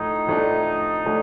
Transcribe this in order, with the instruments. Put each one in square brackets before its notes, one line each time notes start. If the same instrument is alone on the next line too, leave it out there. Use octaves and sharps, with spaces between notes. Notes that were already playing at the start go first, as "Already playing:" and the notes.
Already playing: [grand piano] A2 F3 A3 [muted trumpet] D#4
[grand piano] A2 F3 A3 D4
A2 F3 A3 D4